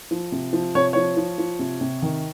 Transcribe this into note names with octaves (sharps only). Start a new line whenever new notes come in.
F3
C3
F3
C3 C#5
F3 C#5
F3
F3
C3
C3
D#3